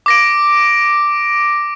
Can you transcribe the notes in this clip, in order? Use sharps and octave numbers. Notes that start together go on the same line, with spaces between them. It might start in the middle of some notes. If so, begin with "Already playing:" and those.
D6 A#6 D7